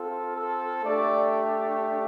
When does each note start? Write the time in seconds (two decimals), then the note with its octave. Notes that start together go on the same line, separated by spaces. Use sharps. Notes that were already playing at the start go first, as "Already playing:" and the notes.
Already playing: C4 F4 A4
0.35 A4
0.84 A3 D4 G4 D5